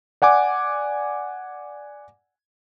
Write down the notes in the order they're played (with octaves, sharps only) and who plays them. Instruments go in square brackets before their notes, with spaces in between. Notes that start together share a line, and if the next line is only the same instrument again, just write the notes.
[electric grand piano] D5 F#5 G#5 D6